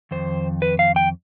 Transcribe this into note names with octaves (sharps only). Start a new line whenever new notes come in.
F2 D#3 C5
B4
F5
G5